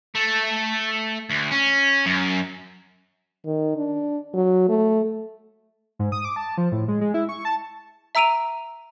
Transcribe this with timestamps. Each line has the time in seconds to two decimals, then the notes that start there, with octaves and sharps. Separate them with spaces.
0.15 A3
1.30 D2
1.51 C#4
2.06 F#2
3.46 D#3
3.77 D4
4.34 F#3
4.69 A3
5.99 G#2
6.12 D#6
6.25 D6
6.36 A5
6.58 F3
6.72 A2
6.88 G#3
7.01 G#3
7.14 E4
7.29 C#6
7.45 A5
8.15 E5 A#5 E6 D7 D#7 F7